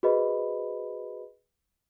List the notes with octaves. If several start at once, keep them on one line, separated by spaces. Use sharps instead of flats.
F#4 G#4 B4 C5 D#5 B5